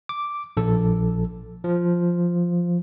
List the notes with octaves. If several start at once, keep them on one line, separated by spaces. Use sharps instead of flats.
D6
A#1 A4
F3